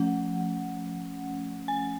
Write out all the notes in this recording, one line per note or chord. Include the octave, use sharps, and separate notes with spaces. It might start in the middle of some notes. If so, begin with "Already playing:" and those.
Already playing: F3 A3 C#4 F#5
G#5